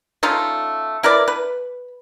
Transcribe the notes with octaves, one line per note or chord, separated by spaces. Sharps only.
A3 C#4 D#4 F4
E4 A#4 B4 D5
B4